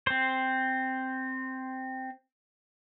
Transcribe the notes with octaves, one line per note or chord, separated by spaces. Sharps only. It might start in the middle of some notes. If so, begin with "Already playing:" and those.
C4 C5